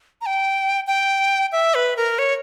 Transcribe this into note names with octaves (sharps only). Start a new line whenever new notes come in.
A#5
G5
G5
E5
B4
A#4
C#5